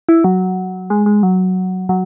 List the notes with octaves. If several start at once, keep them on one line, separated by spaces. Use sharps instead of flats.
E4
F#3
G#3
G#3
F#3
F#3